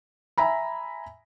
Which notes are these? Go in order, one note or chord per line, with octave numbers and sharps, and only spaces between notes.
E5 G#5 A#5 B5